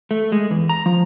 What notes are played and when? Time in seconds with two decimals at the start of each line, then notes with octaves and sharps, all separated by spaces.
0.11 A3
0.32 G#3
0.51 E2
0.69 A#5
0.86 F3